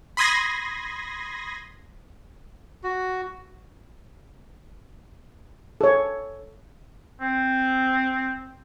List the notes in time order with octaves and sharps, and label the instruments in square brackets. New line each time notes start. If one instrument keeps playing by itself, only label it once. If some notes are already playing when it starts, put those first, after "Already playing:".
[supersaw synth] B5 C6 D#6 G#6 A#6
[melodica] F#4
[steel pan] A4 C#5
[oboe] C4